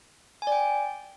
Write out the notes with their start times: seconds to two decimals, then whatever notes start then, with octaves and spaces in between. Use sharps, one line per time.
0.42 G#5
0.47 D5
0.52 G5